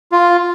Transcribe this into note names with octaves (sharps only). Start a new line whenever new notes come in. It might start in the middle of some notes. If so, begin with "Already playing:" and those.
F4